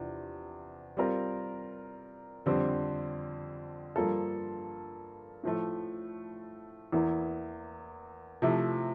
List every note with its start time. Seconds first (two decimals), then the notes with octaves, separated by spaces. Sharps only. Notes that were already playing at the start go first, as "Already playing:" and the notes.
Already playing: E2 C3 F3 D4
0.97 G3 C4 F4 A#4
2.46 F2 D3 G3 C4
3.96 G2 F3 A#3 F4 A4
5.44 A2 F3 A3
6.92 E2 E3 A#3 E4
8.42 C3 F3 A3 E4